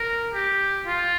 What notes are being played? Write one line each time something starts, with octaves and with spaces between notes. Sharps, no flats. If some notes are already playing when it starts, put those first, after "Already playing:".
Already playing: A#4
G4
F4